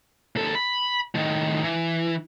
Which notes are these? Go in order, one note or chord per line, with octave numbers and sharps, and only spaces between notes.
D#2 A4
B5
A2 D#3
E3